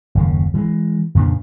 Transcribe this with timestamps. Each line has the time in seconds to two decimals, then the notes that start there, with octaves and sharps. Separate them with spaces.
0.15 F#1 D#2 C#3
0.54 E3 G#3
1.15 F2 A#2 C#3 D4